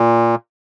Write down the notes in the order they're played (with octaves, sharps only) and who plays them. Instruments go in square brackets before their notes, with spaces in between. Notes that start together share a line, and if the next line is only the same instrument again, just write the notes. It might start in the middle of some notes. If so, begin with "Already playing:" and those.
Already playing: [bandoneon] A#2